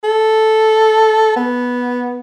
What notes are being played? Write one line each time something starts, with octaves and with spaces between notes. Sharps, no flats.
A4
B3